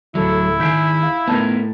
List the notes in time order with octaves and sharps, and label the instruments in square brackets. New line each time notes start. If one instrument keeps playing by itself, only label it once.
[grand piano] D1 A4 [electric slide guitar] F#3 [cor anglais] E4
[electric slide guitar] D#3 G#4 [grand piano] G6 B6 D7
[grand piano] F5
[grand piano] A2 A5 G#6 [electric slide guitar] B3 D#4 A#4